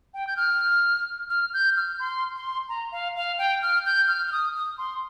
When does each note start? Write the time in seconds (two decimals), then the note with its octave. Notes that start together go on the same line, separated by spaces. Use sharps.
0.14 G5
0.27 G6
0.37 F6
1.30 F6
1.54 G6
1.76 F6
2.00 C6
2.34 C6
2.69 A#5
2.92 F5
3.16 F5
3.38 G5
3.62 F6
3.86 G6
4.08 F6
4.27 F6
4.32 D#6
4.54 D#6
4.78 C6